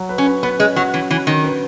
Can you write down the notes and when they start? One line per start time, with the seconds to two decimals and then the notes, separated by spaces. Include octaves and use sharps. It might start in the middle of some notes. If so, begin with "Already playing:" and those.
Already playing: F#3
0.09 B4
0.18 C#4
0.26 B4
0.43 B3 B4
0.59 G#3 C#4
0.76 F#3 F#4
0.93 E3 C#4
1.10 E3 C#4
1.27 D#3 C#4
1.44 B4